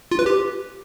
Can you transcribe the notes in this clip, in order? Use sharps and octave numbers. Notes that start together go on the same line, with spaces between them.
F4
B4
G4